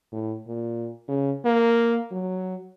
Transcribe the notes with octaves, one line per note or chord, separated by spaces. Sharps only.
A2
A#2
C#3
A#3
F#3